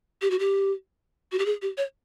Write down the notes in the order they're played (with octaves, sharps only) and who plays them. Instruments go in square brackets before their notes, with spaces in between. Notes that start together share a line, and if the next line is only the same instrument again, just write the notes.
[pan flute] G4
F#4
G4
F#4
G4
G#4
G4
C#5